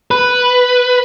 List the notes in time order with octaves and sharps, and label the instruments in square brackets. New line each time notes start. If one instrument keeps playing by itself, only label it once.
[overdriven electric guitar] B4